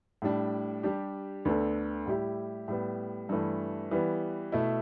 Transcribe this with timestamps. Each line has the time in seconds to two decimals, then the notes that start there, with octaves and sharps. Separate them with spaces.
0.22 A2 G3 D4
0.83 G3 D4 G4
1.45 D2 D3 B3 D4 A4
2.06 A2 G3 E4 G4
2.68 A2 G3 B3
3.29 G2 E3 A3
3.91 E3 G3 B3
4.52 B2 A3 E4